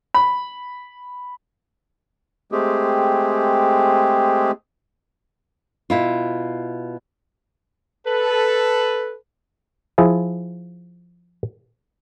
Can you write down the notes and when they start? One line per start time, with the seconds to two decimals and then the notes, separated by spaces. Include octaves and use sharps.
0.14 B5
2.52 G#3 A3 C4 G4 G#4
5.90 B2 E4 F4
8.06 A4 B4
9.98 F3 E4 G#4